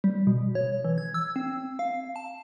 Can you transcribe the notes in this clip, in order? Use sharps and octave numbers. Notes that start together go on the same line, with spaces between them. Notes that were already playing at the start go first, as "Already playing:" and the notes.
G3
B2
C#5
E3
G#6
E6
C4
F5
A5